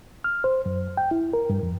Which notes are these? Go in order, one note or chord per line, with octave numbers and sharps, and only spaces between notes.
F6
C5
F#2
G5
E4
A#4
G2
F2